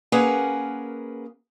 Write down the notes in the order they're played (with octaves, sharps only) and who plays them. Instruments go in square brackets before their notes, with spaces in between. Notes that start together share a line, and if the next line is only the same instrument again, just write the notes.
[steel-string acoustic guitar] A#3 C#4 G#4 A#4 B4 F#5